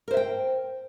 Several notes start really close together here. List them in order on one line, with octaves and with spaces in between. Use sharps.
A#4 C5 E5 G5